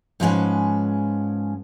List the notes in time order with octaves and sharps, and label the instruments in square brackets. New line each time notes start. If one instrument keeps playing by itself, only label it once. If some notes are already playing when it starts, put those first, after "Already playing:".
[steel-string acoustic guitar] G#2 F3 G#3 C4 C#4 B4